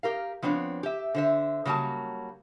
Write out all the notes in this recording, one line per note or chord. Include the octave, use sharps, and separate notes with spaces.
G4 A#4 F5
F3 B3 C4 D4 C#5
G4 E5
D3 C5 E5
C#3 F#3 G3 A#3 A5